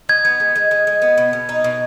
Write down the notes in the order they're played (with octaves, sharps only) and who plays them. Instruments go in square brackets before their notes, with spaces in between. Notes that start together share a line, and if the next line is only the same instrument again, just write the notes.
[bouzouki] D#4 [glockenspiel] G#6
[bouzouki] B3
G#3
G#3
G#3
G#3
B3
B2
B2
D#4
B2